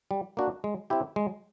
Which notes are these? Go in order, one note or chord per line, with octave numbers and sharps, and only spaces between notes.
G3
A#3 D4 F#4
G#3
C4 E4 G4
G#3